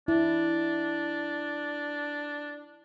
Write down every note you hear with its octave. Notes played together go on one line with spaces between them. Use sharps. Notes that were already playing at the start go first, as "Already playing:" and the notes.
D4 E4